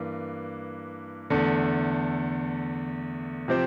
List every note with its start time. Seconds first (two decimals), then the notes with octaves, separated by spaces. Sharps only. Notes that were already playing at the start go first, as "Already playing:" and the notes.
Already playing: G2 E3 A#3
1.30 E2 D3 A3
3.48 C3 F3 C4 G4 C5